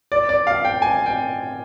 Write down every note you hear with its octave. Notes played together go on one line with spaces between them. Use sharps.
D5
D5
F5
G5
G#5
G5